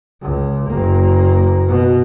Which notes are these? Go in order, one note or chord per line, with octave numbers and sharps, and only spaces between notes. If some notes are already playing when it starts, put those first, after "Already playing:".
C#2
F#1 A#3
B2